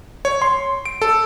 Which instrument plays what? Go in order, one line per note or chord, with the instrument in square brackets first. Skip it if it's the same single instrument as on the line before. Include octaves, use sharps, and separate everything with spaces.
[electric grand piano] C#5
C6
D7
A4